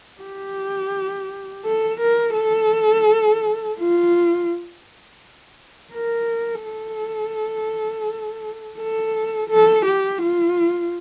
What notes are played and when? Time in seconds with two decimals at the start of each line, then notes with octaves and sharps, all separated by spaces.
0.22 G4
1.65 A4
2.01 A#4
2.36 A4
3.80 F4
5.93 A#4
6.66 A4
8.79 A4
9.50 A4
9.86 G4
10.22 F4